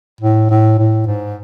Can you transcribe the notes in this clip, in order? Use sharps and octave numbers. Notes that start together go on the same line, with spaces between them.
A2
A2
A2
G#2